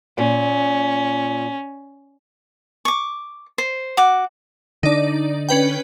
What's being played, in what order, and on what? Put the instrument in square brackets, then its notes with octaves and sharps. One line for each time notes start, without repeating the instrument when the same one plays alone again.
[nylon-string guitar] A#2 [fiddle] C#4
[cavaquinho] C#6 D6
C5
F#4 D6
[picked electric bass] D3 D4 [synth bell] D#4 D5
[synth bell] C#4 B4 G5